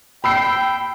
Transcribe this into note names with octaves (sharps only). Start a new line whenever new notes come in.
G5 B5 E6 C7